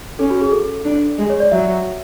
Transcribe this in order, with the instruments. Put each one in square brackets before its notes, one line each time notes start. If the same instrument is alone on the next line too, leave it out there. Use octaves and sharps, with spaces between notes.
[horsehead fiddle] C#4 [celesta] A4
[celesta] F#4
G#4
A4
[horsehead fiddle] D4
G#3
[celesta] C#5
D5
[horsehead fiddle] F#3 [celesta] E5